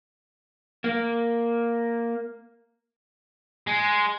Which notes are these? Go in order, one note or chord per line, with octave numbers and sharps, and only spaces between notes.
A#3
G#3